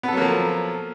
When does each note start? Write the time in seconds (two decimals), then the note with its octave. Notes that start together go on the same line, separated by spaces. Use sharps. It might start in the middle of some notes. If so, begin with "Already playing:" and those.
0.03 B3
0.08 A4
0.13 F#3
0.17 A#3
0.22 F3